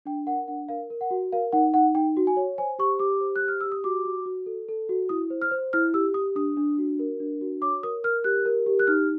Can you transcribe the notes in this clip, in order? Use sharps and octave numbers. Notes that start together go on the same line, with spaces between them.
D4 G5
A#4 F#5
D4 F#5
A#4 F5
A#4
F#5
F#4
A#4 F5
D#4 F#5
D#4 F#5
D#4 G5
F#4
G#5
C#5
C5 G#5
G4 C#6
G4 D6
C5
F#6
G4
F6
G4 E6
D#6
F#4 D6
F#4
F#4
A4
A4
F#4
E4 D#6
C5
F6
C5
E4 F6
G4 E6
G4 D#6
D4 D#6
D4
F#4
A#4
D4
F#4
C#5 D6
A#4 D#6
A#4 F6
G4 F#6
A#4
G4
F#6
D#4 F6